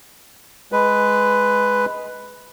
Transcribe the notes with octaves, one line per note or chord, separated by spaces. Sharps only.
G#3 B4